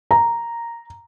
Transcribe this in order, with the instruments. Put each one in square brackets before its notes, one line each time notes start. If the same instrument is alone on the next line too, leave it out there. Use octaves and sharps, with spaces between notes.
[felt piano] A#5